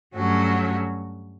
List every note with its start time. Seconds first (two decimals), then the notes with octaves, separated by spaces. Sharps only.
0.16 G2 F#3 A3 C#4 F#4